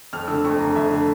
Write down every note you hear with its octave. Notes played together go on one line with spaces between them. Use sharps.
F2 F6
D3 A3 E6
F2 C#6
D3 A3 A#5
F2 E5
D3
A3